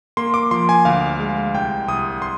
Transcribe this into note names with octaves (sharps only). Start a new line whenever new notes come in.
A#3 C6
D6
F3 C6
G#5
D2 F5
G#3
C2 G5
C2 D#6
C6